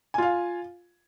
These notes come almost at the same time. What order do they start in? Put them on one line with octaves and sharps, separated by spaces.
G#5 F4 F5